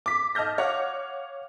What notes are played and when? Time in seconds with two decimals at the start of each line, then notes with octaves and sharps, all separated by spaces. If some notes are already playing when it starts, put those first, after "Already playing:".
0.06 D6 B6
0.35 D#5 A5 F6 G6 A#6
0.58 C#5 F5 F#5 D6